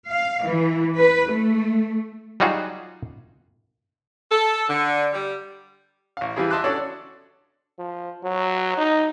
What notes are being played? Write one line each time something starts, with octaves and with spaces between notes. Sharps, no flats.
F5
E3
B4
A3
F#3 G3 D#4 F4 F#4 G#4
A4
D3
G3
A1 F5
E3 F3 G3 E4 G#4
D#5 E5 A5 C6 D6 F#6
C#4 D4 F#4 A4 C#5 D5
F3
F#3
D#4